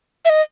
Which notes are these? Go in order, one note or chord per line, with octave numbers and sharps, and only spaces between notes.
E5
D#5